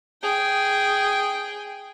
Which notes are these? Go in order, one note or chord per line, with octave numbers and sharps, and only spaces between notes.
G#4 G5